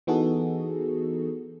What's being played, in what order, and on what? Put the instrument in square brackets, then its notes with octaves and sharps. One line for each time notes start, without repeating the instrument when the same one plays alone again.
[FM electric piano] E3 B3 D#4 F#4 G#4 A4